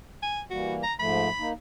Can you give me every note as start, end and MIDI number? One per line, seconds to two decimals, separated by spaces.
0.22 0.40 80
0.50 0.84 52
0.50 0.84 55
0.50 0.84 58
0.50 0.74 66
0.83 0.93 82
0.99 1.29 44
0.99 1.29 53
0.99 1.29 57
0.99 1.49 83
1.39 1.53 58
1.39 1.53 63